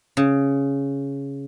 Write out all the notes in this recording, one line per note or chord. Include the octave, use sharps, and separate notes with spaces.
C#3